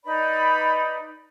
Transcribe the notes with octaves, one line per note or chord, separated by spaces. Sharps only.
D#4 B4 D5 B5